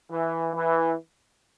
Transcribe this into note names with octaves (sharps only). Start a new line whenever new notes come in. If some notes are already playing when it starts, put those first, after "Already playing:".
E3
E3